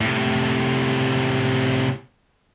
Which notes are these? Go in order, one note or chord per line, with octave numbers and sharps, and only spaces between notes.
A2 C3